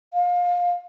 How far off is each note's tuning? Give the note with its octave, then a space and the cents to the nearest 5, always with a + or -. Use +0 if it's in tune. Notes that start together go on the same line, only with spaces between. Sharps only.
F5 +25